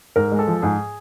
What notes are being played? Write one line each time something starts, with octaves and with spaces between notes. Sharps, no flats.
G#2 A#4
G#3
A4
F3
G#2 G#4